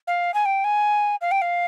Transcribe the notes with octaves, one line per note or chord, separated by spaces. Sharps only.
F5
G#5
G5
G#5
F5
G5
F5